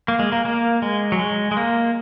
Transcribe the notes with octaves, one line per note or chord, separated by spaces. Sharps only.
A#3
G#3
A#3
A#3
G#3
F#3
G#3
G#3
A#3